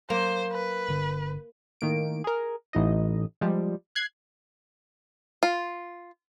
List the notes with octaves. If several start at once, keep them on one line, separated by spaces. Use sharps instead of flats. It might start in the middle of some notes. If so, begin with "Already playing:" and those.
F#3 A#3 C5
B4
G1 D3
A2 D#3 A#3 D7
G#4 A#4
A1 D#4 D#5
F3 G3 G#3
F#6 G#6 C7
F4